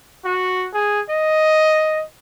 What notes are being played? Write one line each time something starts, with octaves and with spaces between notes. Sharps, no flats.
F#4
G#4
D#5